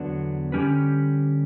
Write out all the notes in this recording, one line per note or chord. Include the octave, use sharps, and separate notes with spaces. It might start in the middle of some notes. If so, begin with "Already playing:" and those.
Already playing: E2 D3 F#3 B3 D4
D3 G3 C#4 G4 B4